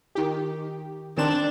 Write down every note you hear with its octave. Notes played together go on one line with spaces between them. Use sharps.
D#3 G4
D#3 C4 D4 E7